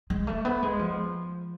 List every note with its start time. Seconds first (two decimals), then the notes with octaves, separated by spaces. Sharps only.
0.10 G#3
0.27 A3
0.45 B3
0.63 G#3
0.79 F3